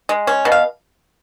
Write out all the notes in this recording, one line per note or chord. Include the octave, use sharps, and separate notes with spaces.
G#3
C#4
B2
F5